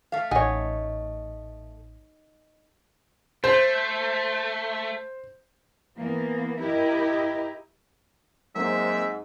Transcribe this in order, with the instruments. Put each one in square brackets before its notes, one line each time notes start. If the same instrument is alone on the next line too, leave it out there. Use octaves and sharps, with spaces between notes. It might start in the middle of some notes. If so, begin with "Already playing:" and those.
[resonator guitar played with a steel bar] A3 F5
[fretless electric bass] A1 [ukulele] D#4 C#5 [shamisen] D#5 F#5 G#5
[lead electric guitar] A3 [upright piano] C5
[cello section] E3 A#3 B3
E4 G4 A#4 D#5
[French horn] G#2 [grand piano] F#3 A#3 C4 [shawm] E5